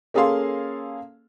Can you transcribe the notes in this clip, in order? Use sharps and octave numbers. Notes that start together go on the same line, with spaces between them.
A#3 C#4 G#4 A4 F5 C6